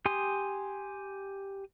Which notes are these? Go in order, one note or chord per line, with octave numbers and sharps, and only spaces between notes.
G4 G#5 C6 D#6